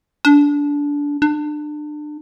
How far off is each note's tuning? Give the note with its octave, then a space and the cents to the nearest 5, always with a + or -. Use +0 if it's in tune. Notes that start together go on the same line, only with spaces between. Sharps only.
D4 -20
D4 +30